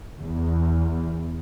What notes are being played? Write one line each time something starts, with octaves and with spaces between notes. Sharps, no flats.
E2